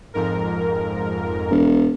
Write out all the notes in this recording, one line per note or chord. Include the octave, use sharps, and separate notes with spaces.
F2 G#2 A#4
E1